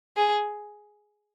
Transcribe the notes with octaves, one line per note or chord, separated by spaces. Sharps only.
G#4